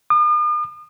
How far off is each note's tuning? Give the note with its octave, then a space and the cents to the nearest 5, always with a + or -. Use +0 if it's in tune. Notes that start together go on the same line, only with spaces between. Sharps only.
D#6 -45